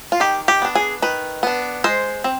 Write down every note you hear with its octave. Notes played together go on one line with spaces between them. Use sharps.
F4
D#3 G4
G4
B3 D4
G#4
D#3 B4
B3 D4
G#3 C5
C4